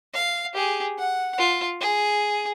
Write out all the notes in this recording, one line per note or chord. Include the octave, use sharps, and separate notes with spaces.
F5
G4 G#4
F#5
F4
G#4